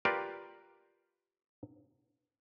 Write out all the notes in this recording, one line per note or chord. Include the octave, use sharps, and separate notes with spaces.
F4 G4 A#4 B4 D5